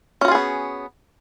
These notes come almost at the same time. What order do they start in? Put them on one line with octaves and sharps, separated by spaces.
C#4 F#4 F4 G#4 B3